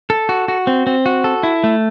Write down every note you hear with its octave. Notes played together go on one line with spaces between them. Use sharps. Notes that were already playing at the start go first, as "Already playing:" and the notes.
A4
F#4
F#4
C4
C4
F#4
A4
E4
A3